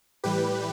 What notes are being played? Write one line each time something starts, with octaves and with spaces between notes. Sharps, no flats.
A2 E3 G3 G4 B4